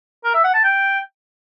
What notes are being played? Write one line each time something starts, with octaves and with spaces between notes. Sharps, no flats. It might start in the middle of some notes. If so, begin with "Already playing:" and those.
A#4
E5
F#5
A5
G5